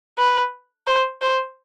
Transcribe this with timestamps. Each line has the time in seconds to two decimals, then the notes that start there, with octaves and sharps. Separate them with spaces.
0.18 B4
0.87 C5
1.22 C5